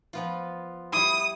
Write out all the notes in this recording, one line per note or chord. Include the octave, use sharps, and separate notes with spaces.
F3 B3 F4
G3 E4 D#6